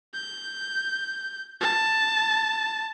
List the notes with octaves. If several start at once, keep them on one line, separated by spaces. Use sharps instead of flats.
G6
A5